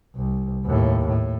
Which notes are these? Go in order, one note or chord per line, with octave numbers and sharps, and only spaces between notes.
C2
D#2 A2
A2